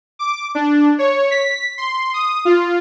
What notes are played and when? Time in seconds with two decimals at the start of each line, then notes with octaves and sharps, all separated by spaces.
0.19 D6
0.55 D4
0.99 C#5
1.31 B6
1.78 C6
2.14 D#6
2.45 F4